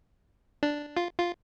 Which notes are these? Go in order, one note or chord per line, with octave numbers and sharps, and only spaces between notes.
D4
F4
F4